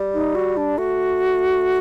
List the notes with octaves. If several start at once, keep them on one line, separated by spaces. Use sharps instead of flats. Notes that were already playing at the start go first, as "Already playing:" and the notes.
Already playing: G3
D#4
F#4
D4
A3 F#4